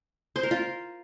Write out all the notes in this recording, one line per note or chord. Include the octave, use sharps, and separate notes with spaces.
C5
A#4
F4